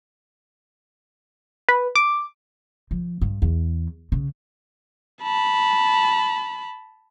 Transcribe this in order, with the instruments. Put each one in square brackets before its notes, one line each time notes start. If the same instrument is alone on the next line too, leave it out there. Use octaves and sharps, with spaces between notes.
[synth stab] B4
D6
[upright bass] F3
G2
E2
C#3
[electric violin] A5 B5